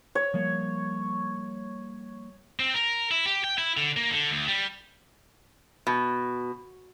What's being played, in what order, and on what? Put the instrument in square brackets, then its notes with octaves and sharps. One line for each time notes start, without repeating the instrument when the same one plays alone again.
[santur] C#5
[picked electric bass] F3 G3 A#3
[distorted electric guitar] C4
A#4
E4
G4
G5
E4
D3
A#3
D3
D2
G3
[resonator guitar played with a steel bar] B2